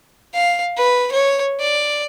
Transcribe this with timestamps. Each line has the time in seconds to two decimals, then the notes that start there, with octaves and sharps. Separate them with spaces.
0.34 F5
0.77 B4
1.12 C#5
1.60 D5